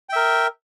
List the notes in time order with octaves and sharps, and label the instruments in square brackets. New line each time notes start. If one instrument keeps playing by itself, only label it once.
[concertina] G5
E5
A#4